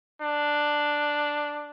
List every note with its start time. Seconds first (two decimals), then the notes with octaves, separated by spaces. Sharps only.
0.21 D4